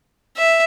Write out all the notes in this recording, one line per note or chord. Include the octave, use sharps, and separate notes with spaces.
E5